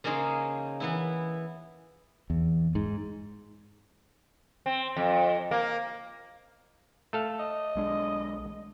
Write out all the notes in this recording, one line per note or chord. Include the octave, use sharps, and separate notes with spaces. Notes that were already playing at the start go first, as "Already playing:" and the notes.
C#3 A#3 C#4 D#4 G#4 C5
E3 B3 E4
E2
G#2
C4
F2
A#3
A3 A4 F5
D#5
B1 G#3 D4